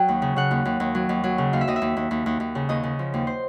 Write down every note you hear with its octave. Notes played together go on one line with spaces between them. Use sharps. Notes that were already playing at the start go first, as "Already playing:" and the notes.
Already playing: F#3 G5
D#2
C#3
C#3 F#5
D#2
D#2
D#2
F#3
D#2
F#3
C#3
D#2 F5
E5
D#2 D#5
E5
D#2
D#2
D#2
D#2
D#2
C#3
D#2 D#5
C#3
F3
D#2
C5